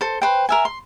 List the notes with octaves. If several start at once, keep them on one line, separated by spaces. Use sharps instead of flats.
A4 C5
B4 C5 G5
A#4 E5 G#5
C6